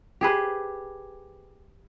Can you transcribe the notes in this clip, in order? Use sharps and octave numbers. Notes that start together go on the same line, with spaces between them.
G4 G#4 B4 C5